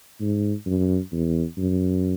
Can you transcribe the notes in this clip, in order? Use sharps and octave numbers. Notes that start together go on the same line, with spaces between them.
G#2
F#2
E2
F#2